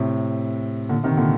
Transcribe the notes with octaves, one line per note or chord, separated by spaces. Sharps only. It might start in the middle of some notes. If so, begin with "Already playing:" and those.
Already playing: A2 C3
A#2 D3
C3 D#3
A#2 D3